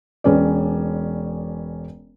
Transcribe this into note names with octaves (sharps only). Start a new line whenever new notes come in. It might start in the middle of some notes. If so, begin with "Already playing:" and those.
E1 C#4 B4 D5